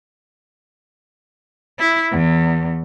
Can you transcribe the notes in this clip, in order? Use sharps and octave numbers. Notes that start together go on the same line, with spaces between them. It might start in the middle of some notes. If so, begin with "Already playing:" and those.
E4
E2